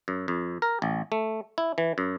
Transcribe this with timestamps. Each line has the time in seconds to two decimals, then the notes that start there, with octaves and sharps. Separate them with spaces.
0.08 F#2
0.28 F2
0.62 A#4
0.82 A1
1.12 A3
1.58 E4
1.78 E3
1.98 F#2